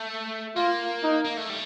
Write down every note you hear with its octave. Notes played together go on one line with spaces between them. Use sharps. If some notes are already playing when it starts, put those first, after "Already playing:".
Already playing: A3
A#3 F4
D#4
A#3
A3
G3